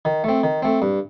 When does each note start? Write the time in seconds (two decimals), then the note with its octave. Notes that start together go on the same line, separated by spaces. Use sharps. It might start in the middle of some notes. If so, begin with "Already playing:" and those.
0.05 D#3
0.24 A3 C4
0.43 D#3
0.62 A3 C4
0.82 G2